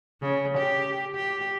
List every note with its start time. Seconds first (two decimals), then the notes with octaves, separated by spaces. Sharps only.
0.22 C#3
0.57 G4
1.15 G4